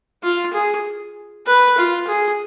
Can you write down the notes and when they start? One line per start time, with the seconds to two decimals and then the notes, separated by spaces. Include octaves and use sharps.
0.23 F4
0.53 G#4
1.47 B4
1.77 F4
2.08 G#4